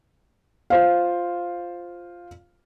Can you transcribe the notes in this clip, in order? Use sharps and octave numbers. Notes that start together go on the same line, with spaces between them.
F4 C5 F5